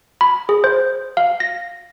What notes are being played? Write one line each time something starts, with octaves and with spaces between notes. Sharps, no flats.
B5
G#4
C5
F5
A#6